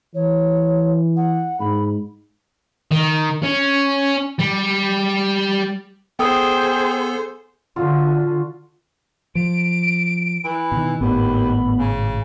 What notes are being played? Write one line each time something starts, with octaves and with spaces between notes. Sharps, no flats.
E3 C#5
F#5
G#2 B5
D#3
C#4
G3
B3 G#4 A4 C5 G5 D#6
D3 F4 F#4
F3 D7
E3 B5
B2 D#3
G#1 D#2 A2 B3 B5
C#3